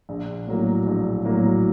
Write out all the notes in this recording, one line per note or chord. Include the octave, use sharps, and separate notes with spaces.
A#1
A2 F#3 A#3
A#1
A2 F#3 A#3